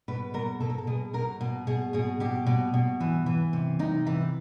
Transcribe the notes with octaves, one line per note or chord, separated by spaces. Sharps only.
B2 B4
B2 A#4
B2 A4
A#4
A4
B2 G#4
B2 A#4
B2
B2 G#4
B2 G#4
B2 G4
B2
B2
E3
E3
C3
C3 D#4
E3